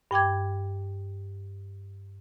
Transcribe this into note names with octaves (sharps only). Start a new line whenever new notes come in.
G2 G5 D6 G#6